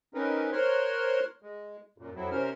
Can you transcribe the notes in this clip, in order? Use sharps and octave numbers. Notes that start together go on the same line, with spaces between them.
C4 C#4 D#4 A#4 B4
A#4 C5 C#5 C6 F6 F#6
G#3
F#2 A#2
F2 F#3 C4 E4
C3 C#4 A#4 C5 F6